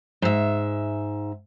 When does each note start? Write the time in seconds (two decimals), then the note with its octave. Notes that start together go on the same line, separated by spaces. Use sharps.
0.22 G#2 E5